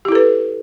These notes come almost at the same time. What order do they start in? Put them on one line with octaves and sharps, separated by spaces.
G4 E4 A4 B4